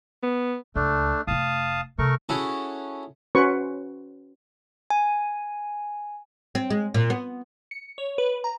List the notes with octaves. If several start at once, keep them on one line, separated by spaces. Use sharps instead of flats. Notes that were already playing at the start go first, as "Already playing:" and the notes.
B3
C#2 A3 D4
F1 A3 F5 A5 D#6
C3 A3 A#4 C#6
C#4 E4 F#4 G#4 A4
C#4 F#4 B4 C5 C#6
G#5
C4
G#3
A#2
B3
C#7
C#5
B4
A#5